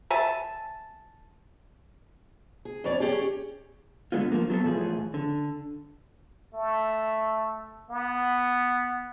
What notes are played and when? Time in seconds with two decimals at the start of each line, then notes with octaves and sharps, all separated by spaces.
0.10 E5 G#5 A5
2.65 G#4
2.84 F2 C#5 D5
3.00 C#4 G4 G#4
4.12 G2 A#2 D3 G#3 B3 F4
4.32 F3 A#3
4.50 F#3 B3 A4
4.64 A2 E3 F3 G#4
5.14 D3
6.54 A3
7.90 B3